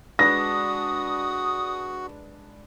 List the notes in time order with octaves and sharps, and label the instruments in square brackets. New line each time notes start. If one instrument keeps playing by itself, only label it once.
[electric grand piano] G#3 D4 B4 [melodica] F#4 [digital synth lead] D#6 [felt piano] A#6